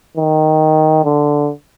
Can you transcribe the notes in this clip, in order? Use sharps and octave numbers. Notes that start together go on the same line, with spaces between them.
D#3
D3